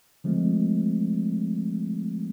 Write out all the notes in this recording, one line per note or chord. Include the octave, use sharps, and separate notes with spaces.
D3 F3 G#3 A3 C4